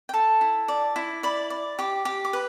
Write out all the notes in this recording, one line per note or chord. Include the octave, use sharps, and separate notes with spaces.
G5
A4 A5
E4
D5
E4
D5 B5
D5
G4 D6
G4
D6
B4